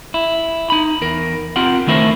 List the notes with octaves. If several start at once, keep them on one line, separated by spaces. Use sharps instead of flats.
E4
D#4 B5
E2 A#4
C4 F4 G4 A#4 F#5
D3 D#3 A3 E4 A#4 C5